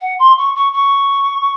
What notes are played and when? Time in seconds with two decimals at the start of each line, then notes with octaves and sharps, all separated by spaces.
0.01 F#5
0.19 C6
0.37 C#6
0.55 C#6
0.72 C#6